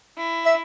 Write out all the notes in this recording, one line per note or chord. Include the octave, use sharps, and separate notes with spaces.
E4
E5